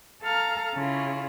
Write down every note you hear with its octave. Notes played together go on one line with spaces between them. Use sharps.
A4 F5 A#5 F6
C#3 C#4 E4 F4